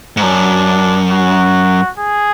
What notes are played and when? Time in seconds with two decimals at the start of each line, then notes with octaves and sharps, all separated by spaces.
0.17 G#2
0.22 F#2 D4
1.10 F#4
1.98 G#4